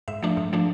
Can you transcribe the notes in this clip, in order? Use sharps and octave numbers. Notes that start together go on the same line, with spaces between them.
G#2 E5
F3 A3 D4
G#2
F3 A3 D4